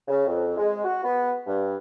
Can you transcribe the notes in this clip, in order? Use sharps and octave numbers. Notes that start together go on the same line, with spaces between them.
C#3
F2
G#3
F#4
B3
G2